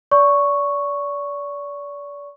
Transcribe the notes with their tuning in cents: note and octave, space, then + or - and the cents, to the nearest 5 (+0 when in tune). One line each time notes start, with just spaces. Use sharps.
D5 -35 C#6 +0